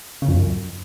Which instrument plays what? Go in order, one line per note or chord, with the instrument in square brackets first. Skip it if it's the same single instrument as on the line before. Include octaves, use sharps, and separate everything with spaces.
[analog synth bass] C#3
F2
F#2